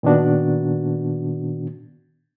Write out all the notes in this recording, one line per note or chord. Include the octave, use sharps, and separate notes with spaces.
A#2 D#3 B3 D4 F#4